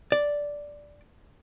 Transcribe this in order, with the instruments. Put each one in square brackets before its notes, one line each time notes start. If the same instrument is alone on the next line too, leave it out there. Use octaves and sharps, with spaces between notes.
[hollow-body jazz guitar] D5